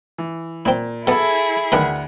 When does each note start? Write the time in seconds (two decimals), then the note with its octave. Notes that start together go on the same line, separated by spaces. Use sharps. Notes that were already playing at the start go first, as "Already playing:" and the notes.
0.18 E3
0.65 A#2 C4 E4
1.07 B2 B3 E4 G#4 A4 E5 B5
1.72 D2 D#3 B3 D4 F#5 B5